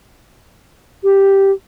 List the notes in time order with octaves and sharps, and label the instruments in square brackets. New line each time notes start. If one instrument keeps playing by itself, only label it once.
[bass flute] G4